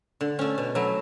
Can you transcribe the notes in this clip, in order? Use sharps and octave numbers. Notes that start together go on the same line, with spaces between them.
D3
A3 C#4
B2
F#3 A3 E4